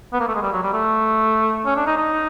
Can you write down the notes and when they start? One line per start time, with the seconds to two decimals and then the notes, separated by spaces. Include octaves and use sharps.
0.13 B3
0.20 A#3
0.28 A3
0.35 G#3
0.43 G3
0.52 F#3
0.63 G3
0.73 A3
1.66 C#4
1.76 D4
1.87 D#4
1.97 D#4